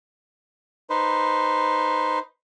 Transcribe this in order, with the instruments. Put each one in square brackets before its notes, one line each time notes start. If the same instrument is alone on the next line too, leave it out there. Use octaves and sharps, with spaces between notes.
[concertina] D#4 B4 C5